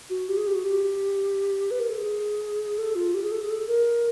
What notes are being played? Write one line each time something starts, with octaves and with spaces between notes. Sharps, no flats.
F#4
G4
G#4
G4
F#4
G4
B4
A#4
A4
G#4
A4
F4
G4
G#4
A4
G#4
A4
A#4